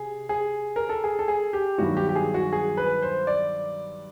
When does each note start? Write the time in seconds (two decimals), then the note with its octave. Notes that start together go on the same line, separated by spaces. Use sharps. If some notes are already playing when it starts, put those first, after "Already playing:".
Already playing: C3 G#4
0.29 G#4
0.76 A#4
0.89 A4
1.04 G#4
1.19 A4
1.28 G#4
1.53 G4
1.78 G2 D#3 F#3 B3 F#4
1.97 G4
2.09 G4
2.15 G#4
2.34 F#4
2.53 G#4
2.77 B4
3.02 C5
3.27 D5